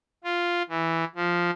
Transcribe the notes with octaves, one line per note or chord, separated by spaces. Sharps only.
F4
E3
F3